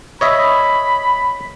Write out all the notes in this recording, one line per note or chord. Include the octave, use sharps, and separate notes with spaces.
C#5 D#5 E5 B5